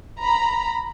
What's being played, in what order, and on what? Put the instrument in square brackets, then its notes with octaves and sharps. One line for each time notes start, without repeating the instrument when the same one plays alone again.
[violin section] A#5 B5